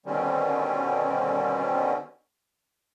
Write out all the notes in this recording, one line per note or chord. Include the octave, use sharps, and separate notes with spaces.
B2 D3 D#3 G3 C4 C#4